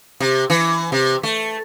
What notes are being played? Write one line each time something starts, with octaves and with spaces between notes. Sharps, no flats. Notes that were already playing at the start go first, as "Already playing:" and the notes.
C3
E3
C3
A3